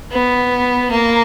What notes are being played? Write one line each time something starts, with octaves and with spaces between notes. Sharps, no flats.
B3
A#3